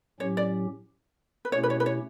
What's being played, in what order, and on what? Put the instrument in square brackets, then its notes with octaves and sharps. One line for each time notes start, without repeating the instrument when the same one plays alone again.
[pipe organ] A2 F#3 C#4 G4 [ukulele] C#5
[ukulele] D5
B4
[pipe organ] B2 A3 C#4 E4 G4 [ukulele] C#5
[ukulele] B4
C#5
B4
C#5